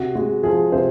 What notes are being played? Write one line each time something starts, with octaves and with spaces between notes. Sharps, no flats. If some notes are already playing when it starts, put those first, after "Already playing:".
Already playing: C3 F#4
G#3 F#4
F3 G#4
C3 C5